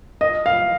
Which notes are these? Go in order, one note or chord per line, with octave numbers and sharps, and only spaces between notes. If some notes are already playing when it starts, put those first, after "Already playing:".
D#5
F5